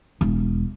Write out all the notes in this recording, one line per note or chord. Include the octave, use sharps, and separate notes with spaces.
E1